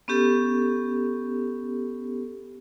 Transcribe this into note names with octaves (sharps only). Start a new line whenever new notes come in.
B3 C#4 G4 A4